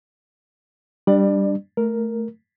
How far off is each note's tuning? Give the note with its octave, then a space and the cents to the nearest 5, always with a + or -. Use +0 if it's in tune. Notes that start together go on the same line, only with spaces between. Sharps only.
G3 +0 D4 +0 D5 +25
A3 +0 A#4 +0